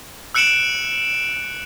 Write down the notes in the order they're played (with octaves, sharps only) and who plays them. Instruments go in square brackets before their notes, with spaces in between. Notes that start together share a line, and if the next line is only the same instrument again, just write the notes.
[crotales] E6 F#6 C#7 D7 E7 F#7